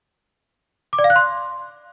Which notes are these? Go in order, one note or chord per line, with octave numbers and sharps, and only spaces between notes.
D6
D5
F5
F#6
C6